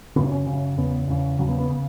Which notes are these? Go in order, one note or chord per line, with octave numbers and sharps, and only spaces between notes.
F#2 C#3 B3
C#4
F#2 C#3
E2 C#3 B3
E2 C#3
E2 C#3 F#3
B3
B3
C#3